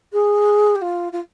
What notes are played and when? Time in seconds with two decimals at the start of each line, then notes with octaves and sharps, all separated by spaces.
0.12 G#4
0.75 G4
0.81 F4
1.12 F4